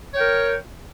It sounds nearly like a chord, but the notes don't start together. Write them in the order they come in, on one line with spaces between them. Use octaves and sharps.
C#5 G5 A#4